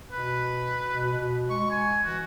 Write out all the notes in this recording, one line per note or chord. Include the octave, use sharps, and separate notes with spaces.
B2 B4
B2
B2
G#3 C#6
G#5
E3 F#4